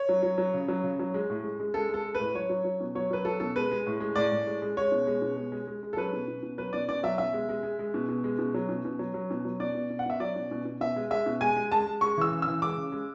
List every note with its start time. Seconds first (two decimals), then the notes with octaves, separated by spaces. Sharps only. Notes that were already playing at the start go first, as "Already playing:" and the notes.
Already playing: C#5
0.09 F#3
0.23 F#3
0.38 F#3
0.54 C#3
0.68 F#3
0.83 C#3
0.99 F#3
1.14 G#3
1.30 A2
1.44 G#3
1.60 G#3
1.74 G#3 A4
1.89 G#3 A4
2.05 G#3
2.15 B4
2.20 A2
2.34 F#3 C#5
2.49 F#3
2.64 F#3
2.80 B2
2.95 F#3 C#5
3.11 F#3 B4
3.25 F#3 A4
3.40 B2 A4
3.56 G#3 B4
3.71 G#3
3.86 A2
4.00 G#3
4.15 A2 D5
4.32 A2
4.47 G#3
4.62 G#3
4.77 G#3 C#5
4.92 B2
5.07 G#3
5.22 B2
5.36 G#3
5.52 G#3
5.67 G#3
5.83 G#3
5.93 A4
5.97 F#3 B4
6.13 B2
6.28 B2
6.43 B2
6.58 F#3 B4
6.73 B2 D5
6.89 B2 D5
7.03 F#3 E5
7.18 B2 E5
7.33 G#3
7.49 G#3
7.63 G#3
7.79 G#3
7.94 B2
8.09 B2
8.24 G#3
8.39 B2
8.54 F#3
8.69 B2
8.85 B2
8.99 F#3
9.14 F#3
9.30 B2
9.45 F#3
9.60 B2 D5
9.75 B2
9.90 B2
9.99 F#5
10.06 B2 E5
10.20 F#3 D5
10.36 B2
10.51 B2
10.65 B2
10.81 B2 E5
10.96 G#3
11.11 G#3 E5
11.26 B2
11.41 G#3 G#5
11.56 G#3
11.72 G#3 A5
11.86 G#3
12.01 G#3 C#6
12.17 E3 E6
12.31 C#3
12.42 E3 E6
12.62 G#3 D6
12.77 C#3
12.92 G#3